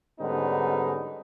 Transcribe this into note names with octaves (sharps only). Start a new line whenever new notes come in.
G#2 D3 G3 B3 C#4 D#4